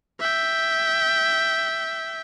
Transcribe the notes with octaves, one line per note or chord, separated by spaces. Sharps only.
E5 G5